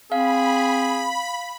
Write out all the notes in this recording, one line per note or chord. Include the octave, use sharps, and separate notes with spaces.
C4 G#4 F5 B5